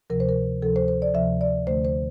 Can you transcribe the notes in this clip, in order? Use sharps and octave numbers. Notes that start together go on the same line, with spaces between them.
D2 C3 F3 A#4
C5
A#4
D2 C3 F3 A4
C5
C5
D5
D2 C3 F3 E5
D5
D2 D3 A3 C5
C5